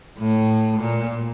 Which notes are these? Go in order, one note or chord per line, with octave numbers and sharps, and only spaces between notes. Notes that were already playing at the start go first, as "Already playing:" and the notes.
A2
A#2